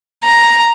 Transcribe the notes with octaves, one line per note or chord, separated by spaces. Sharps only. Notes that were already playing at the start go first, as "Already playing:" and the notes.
A#5